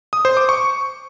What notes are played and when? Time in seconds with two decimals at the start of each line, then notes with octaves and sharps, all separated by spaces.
0.13 D#6
0.25 C5
0.37 D6
0.49 C#6